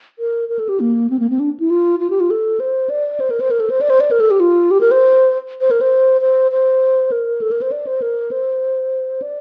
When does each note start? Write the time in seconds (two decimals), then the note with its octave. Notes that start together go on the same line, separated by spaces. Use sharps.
0.19 A#4
0.49 A#4
0.59 A4
0.69 G4
0.80 A#3
1.10 C4
1.20 A#3
1.30 C4
1.40 D4
1.60 E4
1.70 F4
2.00 F4
2.10 G4
2.20 F4
2.30 A4
2.60 C5
2.90 D5
3.20 C5
3.30 A#4
3.40 C5
3.51 A#4
3.60 A4
3.70 C5
3.81 D5
3.90 C5
4.00 D5
4.11 A#4
4.20 A4
4.31 G4
4.40 F4
4.71 G4
4.81 A#4
4.91 C5
5.61 C5
5.71 A#4
5.81 C5
6.21 C5
6.52 C5
7.12 A#4
7.41 A4
7.51 A#4
7.62 C5
7.72 D5
7.87 C5
8.02 A#4
8.31 C5
9.22 D5